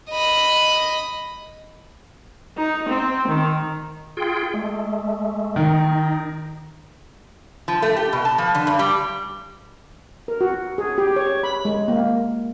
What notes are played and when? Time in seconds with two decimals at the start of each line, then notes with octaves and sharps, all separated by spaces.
0.11 D#5 B5
2.57 D#4
2.89 C4
3.29 D#3
4.17 F4 G#4 G5
4.54 G#3 A3
5.56 D#3 D#4
7.68 F3
7.82 A3
7.97 G4
8.13 B2
8.25 A5
8.38 F3
8.55 D3
8.67 G2
8.79 G3
10.28 A#4
10.41 F#4
10.78 G#4
10.98 G4
11.16 C#5
11.43 B5
11.65 G#3
11.88 A#3